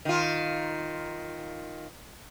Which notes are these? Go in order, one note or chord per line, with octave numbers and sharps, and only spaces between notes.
D#3 F4